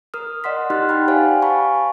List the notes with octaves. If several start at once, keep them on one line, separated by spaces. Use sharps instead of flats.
A#4 D#6 F6
D5 D#5 F#5 C6 B6
D#4 G4 C6 F6 F#6 A6
F#5 G5 B5 F6
G4 C5 D5 F5 F#5 G#5
F5 G#5 A5 B5 C#6